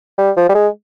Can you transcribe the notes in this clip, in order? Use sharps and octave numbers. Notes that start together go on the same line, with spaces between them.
G3
F3
G3
G#3